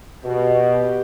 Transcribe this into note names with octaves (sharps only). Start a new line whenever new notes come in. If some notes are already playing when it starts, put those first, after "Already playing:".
B2 G4